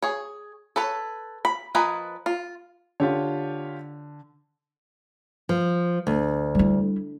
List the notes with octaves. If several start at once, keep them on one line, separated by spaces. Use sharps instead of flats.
G#4 C#5
A4 B4 C#5
B5
F3 A#4 B4 D#5 G#5
F4
D3 F4 G4 C#5
F3
D2
G3 E4